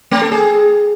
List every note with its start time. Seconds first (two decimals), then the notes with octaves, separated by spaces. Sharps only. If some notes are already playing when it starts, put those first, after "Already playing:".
0.11 A3
0.22 A4
0.32 G#4